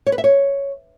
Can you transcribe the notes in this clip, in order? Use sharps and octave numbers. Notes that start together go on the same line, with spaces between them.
C#5
B4
E5
C#5